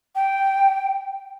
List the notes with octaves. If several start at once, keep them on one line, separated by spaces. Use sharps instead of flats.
G5